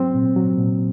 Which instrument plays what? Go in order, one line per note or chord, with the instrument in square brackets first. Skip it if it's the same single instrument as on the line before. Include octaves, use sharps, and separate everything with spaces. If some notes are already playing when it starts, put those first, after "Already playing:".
Already playing: [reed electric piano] F#3 C4
A#2
F#3
A#2